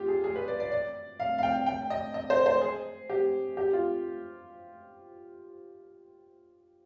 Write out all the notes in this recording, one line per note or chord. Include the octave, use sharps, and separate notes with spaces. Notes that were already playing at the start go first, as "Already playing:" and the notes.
Already playing: F4 G4
G#4
G#4
B4
D5
D5
D5
F5
F5
G5
G5
D#5
D#5
C5
C5
G#4
G4
G4
F4